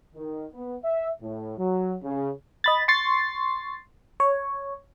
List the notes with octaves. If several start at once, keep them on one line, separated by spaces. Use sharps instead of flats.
D#3
B3
E5
A2
F#3
C#3
D#5 B5 A6
C6 C#6 A6 C7
C#5